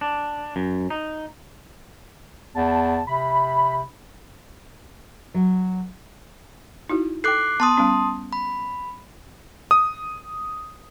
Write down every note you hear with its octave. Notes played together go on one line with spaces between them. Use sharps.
D4
F#2
D#4
E2 A5
C3 B5
F#3
D#4 E4 F#4
A4 G5 D6 F#6 C7
B3 A5 C6 D#6
G3 B3 C#4
B5
D#6